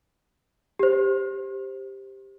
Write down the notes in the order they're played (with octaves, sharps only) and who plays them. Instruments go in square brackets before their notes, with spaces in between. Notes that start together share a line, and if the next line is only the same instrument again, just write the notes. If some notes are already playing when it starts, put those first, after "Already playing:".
[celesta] G4 C5